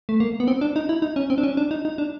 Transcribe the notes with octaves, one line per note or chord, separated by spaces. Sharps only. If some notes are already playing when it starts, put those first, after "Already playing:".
A3
A#3
B3
C4
D4
D#4
E4
D#4
C#4
C4
D4
C#4
D4
D#4
D#4
D4